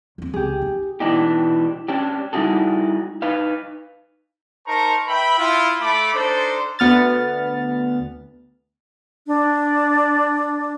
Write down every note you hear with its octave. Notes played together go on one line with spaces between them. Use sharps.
D2 C4
C#2 G4 G#4
D#4
B2 E3 F3 D4 D#4 G4
C#4 D4 G4
G3 D#4 E4 F#4 G#4 A4
D#4 B4 F5
D#4 A#4 C5 A5 A#5 C#6
B4 E5 G5 B5
E4 F4
A3 B5 D6
D4 D#4 A4 C5
D2 B3 F6 A6
D4